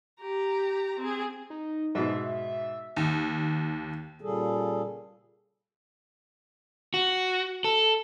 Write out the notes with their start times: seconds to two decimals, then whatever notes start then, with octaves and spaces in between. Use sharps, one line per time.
0.20 G4 A#5
0.99 C4 G#4
1.50 D#4
1.95 G#2 B2 E5
2.96 D#2
4.21 A#2 C#3 G3 G#4 A4
6.94 F#4
7.64 A4